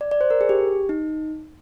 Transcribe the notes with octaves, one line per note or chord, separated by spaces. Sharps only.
D5
D5
C5
A#4
G#4
G4
D#4